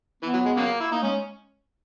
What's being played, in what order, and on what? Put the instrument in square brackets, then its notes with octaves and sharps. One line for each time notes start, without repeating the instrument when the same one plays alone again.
[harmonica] E3 [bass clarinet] B3
[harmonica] F#3
G#3
C#3 F#3 A#3
E4
[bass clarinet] A#3 [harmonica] D#4
[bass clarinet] G#3 [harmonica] C#4